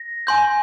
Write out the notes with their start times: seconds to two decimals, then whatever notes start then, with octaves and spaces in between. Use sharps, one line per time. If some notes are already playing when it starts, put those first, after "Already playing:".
Already playing: A#6
0.27 G#5 C6 G6